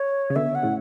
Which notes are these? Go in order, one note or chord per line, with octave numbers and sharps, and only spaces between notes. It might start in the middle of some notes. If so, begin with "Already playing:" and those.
Already playing: C#5
C#3
B2 D3 E5
F#5
A2 C#3